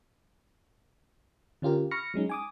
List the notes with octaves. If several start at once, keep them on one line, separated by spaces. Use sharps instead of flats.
D3 C#4 F4 G4 A#4
B5 C#6 F6 A#6 C#7
F#3 G#3 C#4 D#4
G#5 D6 D#6